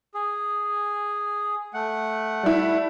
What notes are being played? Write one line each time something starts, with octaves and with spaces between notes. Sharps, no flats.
G#4
A3 F#5
G3 E4